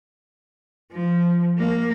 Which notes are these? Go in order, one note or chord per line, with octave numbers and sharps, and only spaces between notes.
F3
A#3